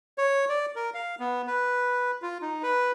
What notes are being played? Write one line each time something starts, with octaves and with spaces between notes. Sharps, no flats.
C#5
D5
A#4
F5
B3
B4
F4
D#4
B4